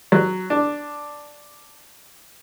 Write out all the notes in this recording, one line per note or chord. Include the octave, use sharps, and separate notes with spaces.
F#3
D4